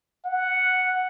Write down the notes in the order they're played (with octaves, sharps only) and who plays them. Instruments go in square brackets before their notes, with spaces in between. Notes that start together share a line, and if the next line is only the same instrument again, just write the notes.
[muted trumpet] F#5